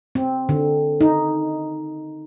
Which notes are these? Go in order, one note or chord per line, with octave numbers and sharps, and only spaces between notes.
C4
D3
D#4